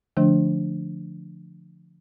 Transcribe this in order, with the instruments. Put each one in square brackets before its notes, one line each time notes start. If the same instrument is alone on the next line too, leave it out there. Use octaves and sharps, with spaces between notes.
[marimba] D3 F3 A3 D4